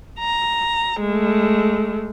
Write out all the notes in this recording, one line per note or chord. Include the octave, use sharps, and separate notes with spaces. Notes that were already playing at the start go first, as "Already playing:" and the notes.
A#5
G#3 A3